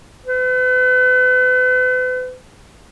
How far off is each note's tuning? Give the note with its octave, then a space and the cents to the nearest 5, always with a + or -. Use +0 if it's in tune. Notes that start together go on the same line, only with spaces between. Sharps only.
B4 +40